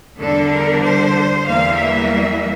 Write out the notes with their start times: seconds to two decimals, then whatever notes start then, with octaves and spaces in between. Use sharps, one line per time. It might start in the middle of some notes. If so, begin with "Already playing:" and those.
0.20 E2 D3 G3 D4 A4
0.51 A#4
0.83 C5
1.45 E2 E3 G3 A#3 F5
1.78 E5